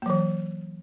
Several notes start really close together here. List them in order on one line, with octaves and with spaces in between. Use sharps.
A#3 F#3 E3